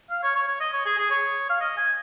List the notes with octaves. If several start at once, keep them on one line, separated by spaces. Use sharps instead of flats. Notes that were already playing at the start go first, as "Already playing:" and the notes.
F5
C#5
C#5
C#5
D#5
C#5
G#4
G#4
C#5
F5
D#5
G#5